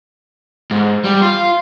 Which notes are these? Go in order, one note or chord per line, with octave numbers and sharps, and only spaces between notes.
G#2
G3
F4